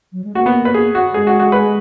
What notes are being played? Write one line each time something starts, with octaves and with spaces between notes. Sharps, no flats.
F#3
G#3
A#3 F#4
B3
B4
G#4
F#4
G#3 G#4
F#4
F#4
B4